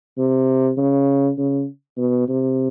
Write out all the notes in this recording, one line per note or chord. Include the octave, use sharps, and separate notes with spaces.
C3
C#3
C#3
B2
C3